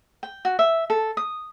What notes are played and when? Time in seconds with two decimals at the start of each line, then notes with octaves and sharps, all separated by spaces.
0.23 G5
0.45 F#4
0.59 E5
0.90 A4
1.17 D#6